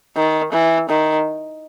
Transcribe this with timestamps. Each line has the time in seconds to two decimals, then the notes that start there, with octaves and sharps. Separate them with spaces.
0.16 D#3
0.52 E3
0.89 D#3